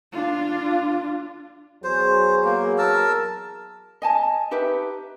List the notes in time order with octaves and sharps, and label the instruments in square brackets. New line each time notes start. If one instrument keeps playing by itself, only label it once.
[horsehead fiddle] D4 F4
[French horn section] E2 F#3 G#4 [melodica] C5
[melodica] A#3
A#4 A5 E6
[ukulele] D#5 G#5 A5
D#4 G4 B4 E5